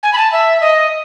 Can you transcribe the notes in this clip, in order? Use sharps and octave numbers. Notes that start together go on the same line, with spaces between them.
G#5
B5
A5
E5
D#5